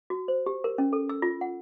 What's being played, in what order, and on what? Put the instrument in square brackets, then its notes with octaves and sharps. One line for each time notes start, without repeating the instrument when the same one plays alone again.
[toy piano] F#4
C5
G4
A#4
C#4
A4
E6
F4
F#5